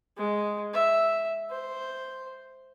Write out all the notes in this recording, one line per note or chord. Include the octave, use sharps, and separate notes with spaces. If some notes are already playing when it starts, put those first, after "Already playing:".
G#3
E5
C5